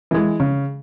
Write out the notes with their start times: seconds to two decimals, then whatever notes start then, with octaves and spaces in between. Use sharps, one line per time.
0.11 E3 G#3
0.40 C#3